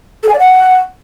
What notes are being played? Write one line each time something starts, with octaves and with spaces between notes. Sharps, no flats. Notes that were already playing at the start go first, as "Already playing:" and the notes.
A4
G#5
D5
F#5